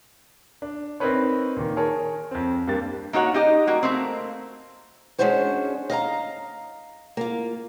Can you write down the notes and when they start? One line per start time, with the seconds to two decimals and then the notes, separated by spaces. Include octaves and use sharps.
0.62 D4
1.00 C4 D#4 A#4 B4 C#5
1.57 A#2 D#3
1.77 G#4 A#4 C#5 A5
2.31 F2 C4
2.67 G2 A#3 G4 A6
3.13 A#3 D#4 F#4 C#5 F#5
3.34 D#4 G4 D#5
3.67 G3 A#3 F#4
3.83 A3 A#3 C4
5.18 G#3 C#4 D4 F#4 C5 C#5
5.90 D#5 F5 G#5 A#5
7.17 A#3 F4